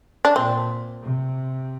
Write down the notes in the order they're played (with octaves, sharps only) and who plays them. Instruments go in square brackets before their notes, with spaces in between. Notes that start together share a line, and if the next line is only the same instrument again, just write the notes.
[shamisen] D4
[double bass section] A#2 [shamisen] C4
[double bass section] C3